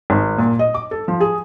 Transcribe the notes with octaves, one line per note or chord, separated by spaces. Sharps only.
G#1
A#2
D#5
D6
A4
F3
G#4